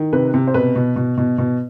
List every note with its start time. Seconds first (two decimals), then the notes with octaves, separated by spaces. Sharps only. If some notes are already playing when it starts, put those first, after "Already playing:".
Already playing: D#3
0.13 C3 B4
0.34 C3
0.47 C5
0.54 B2 B4
0.76 B2
0.96 B2
1.18 B2
1.38 B2